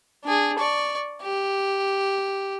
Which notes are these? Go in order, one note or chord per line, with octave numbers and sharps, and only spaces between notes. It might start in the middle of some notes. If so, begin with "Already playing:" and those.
D4 G#4
D5 C#6
G4